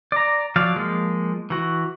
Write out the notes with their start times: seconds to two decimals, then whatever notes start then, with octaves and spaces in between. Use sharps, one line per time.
0.12 D5 A#5
0.56 F3 F#3 D5 F5
0.76 F3 G#3 A#3
1.50 E3 F#4